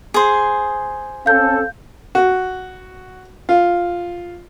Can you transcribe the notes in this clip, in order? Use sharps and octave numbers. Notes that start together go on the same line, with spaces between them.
G#4 C5
C4 C#4 A4 F5 G6
F#4
F4